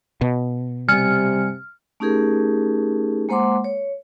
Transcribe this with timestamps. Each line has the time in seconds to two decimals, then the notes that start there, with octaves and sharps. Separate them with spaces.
0.21 B2
0.88 C3 G3 G#5 F6 C#7
2.00 A3 C#4 D#4 G4 G#4 A#4
3.29 G#3 A#3 C5 F#5 C6 D6
3.64 C#5